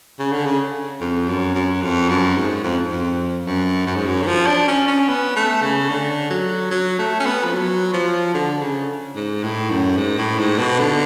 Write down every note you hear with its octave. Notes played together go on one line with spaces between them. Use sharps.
C#3
D3
C#3
F2
F#2
F#2
F2
F#2
G#2
F2
F2
F#2
F#2
G#2
F#2
D3
F3
D4
C#4
C#4
B3
A3
C#3
D3
F#3
F#3
A3
C#4
B3
F3
F#3
F3
D3
C#3
G#2
A2
F#2
G#2
A2
G#2
B2
D3